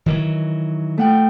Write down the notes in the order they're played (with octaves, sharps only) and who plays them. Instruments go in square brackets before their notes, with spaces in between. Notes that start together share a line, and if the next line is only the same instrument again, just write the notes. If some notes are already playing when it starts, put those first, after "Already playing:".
[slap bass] D#3 E3 F#3
[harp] A3 F#5 G5